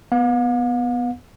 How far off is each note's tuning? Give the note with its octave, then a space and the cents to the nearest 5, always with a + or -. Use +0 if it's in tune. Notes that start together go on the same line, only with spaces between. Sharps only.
B3 +0 F5 +45